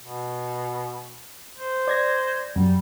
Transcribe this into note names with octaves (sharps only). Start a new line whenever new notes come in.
B2
C5
D5 G#6 A#6
F#2 G3